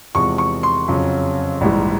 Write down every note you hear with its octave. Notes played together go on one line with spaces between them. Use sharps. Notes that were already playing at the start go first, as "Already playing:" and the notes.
E2 C3 F3 G#3 C#6
C#6
C6
F2 C#3 F#3
A#1 G#2 E3 G3